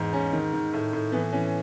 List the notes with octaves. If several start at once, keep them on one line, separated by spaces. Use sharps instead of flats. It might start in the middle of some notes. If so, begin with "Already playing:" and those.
Already playing: E2 G#2
G#2 C#4
D#3
D#3
A2
A2
E3 B3
E3 C#4